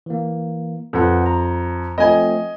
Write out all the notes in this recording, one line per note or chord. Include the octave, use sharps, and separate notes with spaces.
E3 A#3
F2 A4 B4 F#5
A#5
F3 A3 C4 D#5 G#5